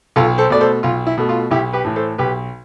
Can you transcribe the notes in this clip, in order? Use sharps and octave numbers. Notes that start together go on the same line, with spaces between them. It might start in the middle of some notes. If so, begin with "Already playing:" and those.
B1 F4 A4
A4 C5
B2 A3 D5
A4 C5
B1 F4
E4
B2 A3
F4
B1 E4 G4
G4 B4
A2 E3
A4 C5
B1 G4 B4